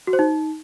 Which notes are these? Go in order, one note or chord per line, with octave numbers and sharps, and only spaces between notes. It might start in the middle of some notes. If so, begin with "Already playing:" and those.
F#4
C5
D#4